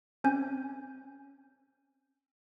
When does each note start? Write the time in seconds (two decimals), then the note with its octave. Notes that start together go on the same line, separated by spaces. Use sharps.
0.24 C4 C#4 G#5 G6